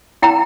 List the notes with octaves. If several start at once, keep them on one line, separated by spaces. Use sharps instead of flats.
E4 G5 A#5